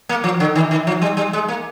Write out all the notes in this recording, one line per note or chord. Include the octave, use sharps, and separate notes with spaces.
A#3
F3
D3
D#3
D#3
F3
G3
G3
G#3
A#3